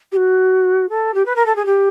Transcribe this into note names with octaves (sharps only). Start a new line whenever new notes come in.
G4
F#4
A4
G4
B4
A#4
A4
G#4
G4